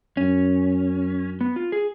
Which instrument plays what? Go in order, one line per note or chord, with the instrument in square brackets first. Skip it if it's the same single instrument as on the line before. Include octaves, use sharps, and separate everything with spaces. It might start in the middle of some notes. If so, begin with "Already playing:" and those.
[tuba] F#2 [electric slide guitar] C#4
[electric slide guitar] B3
F4
G#4